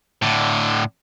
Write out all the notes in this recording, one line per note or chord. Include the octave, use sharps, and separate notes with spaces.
A2 D3